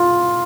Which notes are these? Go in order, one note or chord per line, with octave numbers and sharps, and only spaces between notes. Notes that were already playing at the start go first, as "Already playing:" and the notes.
Already playing: F4